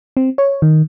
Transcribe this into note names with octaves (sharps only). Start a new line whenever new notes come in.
C4
C#5
D#3